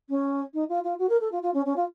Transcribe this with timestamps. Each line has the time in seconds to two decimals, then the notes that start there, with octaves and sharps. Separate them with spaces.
0.09 C#4
0.53 D#4
0.69 F4
0.83 F4
0.98 F#4
1.09 A#4
1.20 A4
1.31 F4
1.42 F4
1.53 C#4
1.65 C#4
1.76 F4